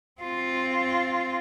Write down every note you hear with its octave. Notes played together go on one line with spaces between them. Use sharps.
C4 F4